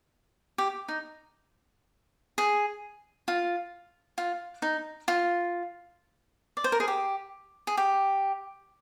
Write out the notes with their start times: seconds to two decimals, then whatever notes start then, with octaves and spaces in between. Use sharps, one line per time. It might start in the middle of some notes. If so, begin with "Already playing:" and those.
0.58 G4
0.88 D#4
2.38 G#4
3.28 F4
4.18 F4
4.62 D#4
5.08 F4
6.57 D5
6.64 C5
6.72 A#4
6.80 G#4
6.88 G4
7.67 G#4
7.77 G4